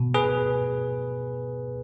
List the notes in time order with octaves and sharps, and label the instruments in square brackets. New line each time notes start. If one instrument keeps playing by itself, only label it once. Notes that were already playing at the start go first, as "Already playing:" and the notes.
Already playing: [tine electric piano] B2
G#4 B4